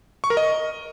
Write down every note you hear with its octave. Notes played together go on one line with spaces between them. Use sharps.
C#6
A#4
D#5